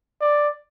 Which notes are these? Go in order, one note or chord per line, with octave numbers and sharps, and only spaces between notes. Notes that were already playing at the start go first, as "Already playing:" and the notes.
D5